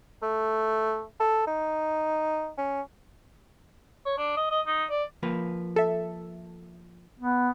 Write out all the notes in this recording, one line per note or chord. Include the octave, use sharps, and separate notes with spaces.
A3
A4
D#4
C#4
C#5
D4
D#5
D#5
D#4
D5
F3 A#3 B4
A4 E5
B3